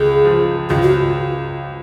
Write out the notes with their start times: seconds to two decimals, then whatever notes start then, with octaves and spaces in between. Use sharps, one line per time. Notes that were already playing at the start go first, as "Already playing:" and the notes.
Already playing: C#2 G#4
0.25 F3
0.70 C#2 F4
0.82 F#4